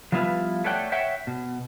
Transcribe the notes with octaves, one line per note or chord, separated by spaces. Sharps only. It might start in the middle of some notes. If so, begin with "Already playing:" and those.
F3 G3 B3 E4 F4 B4
A3 A4 C#5 D5 F#5 G5
C#5 E5 F#5 G5
B2